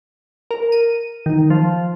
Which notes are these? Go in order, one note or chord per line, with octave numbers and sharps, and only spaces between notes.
A#4
D#7
D#3
F3